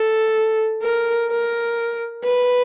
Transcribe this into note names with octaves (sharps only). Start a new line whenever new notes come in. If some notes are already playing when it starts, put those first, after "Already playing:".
Already playing: A4
A#4
A#4
B4